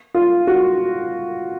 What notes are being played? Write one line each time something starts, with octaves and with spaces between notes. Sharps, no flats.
F4
F#4